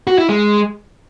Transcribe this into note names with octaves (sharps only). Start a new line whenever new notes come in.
F#4
E4
G#3